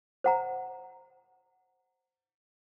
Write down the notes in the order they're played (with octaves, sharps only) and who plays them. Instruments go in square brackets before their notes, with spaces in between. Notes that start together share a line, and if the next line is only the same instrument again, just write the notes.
[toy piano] C5 F#5 A#5